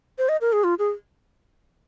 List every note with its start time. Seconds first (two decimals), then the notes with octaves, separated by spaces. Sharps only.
0.18 C5
0.29 D#5
0.41 A#4
0.53 G#4
0.64 F4
0.79 G#4